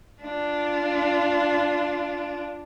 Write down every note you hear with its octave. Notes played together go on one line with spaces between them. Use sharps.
D4 F4